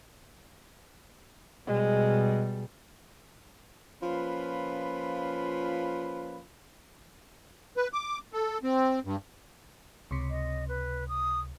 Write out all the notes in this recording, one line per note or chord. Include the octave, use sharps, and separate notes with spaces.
B2 G3 G#3
F3 A#3 C#4 F4 B4 B5
B4
D6
A4
C4
G2
C#2 C3
D#5
B4
D#6